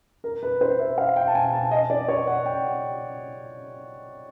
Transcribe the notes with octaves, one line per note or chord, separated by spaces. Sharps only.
A#4
B4
C5
E5
F5
G5
A5
G#5
A5
D#5
D5
C#5
F#5
G5